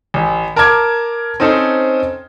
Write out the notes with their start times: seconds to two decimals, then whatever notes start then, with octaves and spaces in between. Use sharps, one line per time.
0.14 A1
0.56 A#4 A5 A#5 D6 G#6
1.40 C4 C#4 D#4 A4 C5